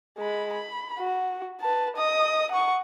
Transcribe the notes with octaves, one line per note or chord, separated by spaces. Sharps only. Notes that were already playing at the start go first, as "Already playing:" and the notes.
G#3 B5
B5
F#4
B4 A5
D#5 D#6
F#5 C#6